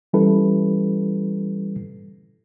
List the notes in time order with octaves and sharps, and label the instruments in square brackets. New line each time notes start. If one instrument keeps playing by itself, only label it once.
[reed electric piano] E3 G3 C#4 E4 A4 B4